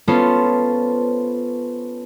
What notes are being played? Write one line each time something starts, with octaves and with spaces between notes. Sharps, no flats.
B3 C#4 F4 A4 C5